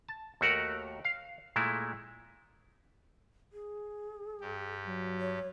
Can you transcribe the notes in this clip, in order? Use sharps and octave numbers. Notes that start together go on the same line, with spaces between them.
A5
D#2 A3 F#4 A#4 F#5 A#5
F5
A#2 G#3 A3 E4
G#4
G2 G4
F#3
C#5